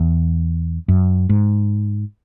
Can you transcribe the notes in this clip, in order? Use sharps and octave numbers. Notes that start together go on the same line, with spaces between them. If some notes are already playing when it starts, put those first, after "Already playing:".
Already playing: E2
F#2
G#2